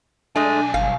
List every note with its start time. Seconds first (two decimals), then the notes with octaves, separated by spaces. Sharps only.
0.36 B1 G#3 A3 D4 G#5
0.74 G1 F5